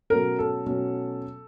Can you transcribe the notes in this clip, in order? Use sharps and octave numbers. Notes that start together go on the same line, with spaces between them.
B2 F#3 A3 C#4 A#4
A4
B2 F#3 A3 C#4